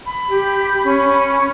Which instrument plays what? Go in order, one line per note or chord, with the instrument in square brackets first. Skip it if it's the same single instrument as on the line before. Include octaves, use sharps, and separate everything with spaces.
[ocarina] B5
[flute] G4
C#4